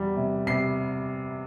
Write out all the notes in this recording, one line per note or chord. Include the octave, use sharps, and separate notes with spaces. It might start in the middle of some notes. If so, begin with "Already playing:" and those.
Already playing: E2 G3
C3
C3 C7